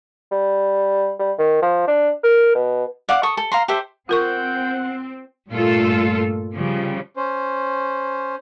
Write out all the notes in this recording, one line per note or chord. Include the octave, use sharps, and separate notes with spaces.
G3
G3
D#3
F3
D4
A#4
B2
D5 F5 F#5 D6
A4 C#6 D#6
A4
F5 A#5 C6
G4 A4 C5 E5
C4 F4 A#4 F#5 G5 C#6
G2 A#2 A3 F4 A4
C#3 F3 G3
C#4 C5